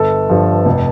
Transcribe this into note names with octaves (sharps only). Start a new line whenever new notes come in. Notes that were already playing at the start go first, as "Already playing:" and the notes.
Already playing: G1 A4
G2 F3
F1